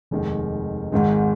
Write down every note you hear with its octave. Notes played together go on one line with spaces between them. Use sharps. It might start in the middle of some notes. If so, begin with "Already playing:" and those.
F1 D#2 D#3 G#3
G#1 G#2 D#3 G#3